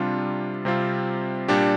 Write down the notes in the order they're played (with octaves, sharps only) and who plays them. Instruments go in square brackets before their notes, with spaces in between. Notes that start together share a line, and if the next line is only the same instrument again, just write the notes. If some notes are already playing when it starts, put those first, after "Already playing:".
Already playing: [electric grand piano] C3 G3 D4 F4
C3 G3 C4 F4
A#2 G3 D4 G4